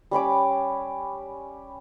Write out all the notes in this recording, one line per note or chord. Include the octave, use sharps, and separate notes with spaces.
G3 C#4 B5 D6